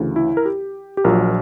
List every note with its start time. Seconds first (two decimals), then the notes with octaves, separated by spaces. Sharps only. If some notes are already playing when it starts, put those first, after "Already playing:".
Already playing: D2 C#3 E3
0.16 E4
0.37 A#4
0.45 G4
0.97 G4
1.04 A#1 A#2 F#3 A#4